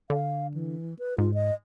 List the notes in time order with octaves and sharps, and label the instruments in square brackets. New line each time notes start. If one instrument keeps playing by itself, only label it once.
[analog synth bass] D3 [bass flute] F5
[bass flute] E3
B4
[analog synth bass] G#2 [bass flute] F4
[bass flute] D#5